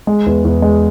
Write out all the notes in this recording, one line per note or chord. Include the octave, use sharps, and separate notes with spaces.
G#3
E2
E2
G#3